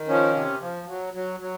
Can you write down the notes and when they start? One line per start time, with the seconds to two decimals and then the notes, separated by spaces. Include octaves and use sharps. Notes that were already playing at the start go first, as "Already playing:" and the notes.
Already playing: D#3
0.08 F3 C#4
0.34 C3
0.61 F3
0.87 F#3
1.14 F#3
1.40 F#3